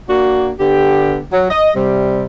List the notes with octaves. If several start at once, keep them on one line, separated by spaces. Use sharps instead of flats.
A#3 D4 F#4
D3 B3 G4
F#3
D#5
C3 G3